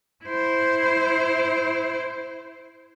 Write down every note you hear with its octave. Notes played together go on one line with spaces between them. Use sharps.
E4 C5